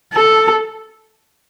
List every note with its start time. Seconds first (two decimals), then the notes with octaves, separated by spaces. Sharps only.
0.14 A4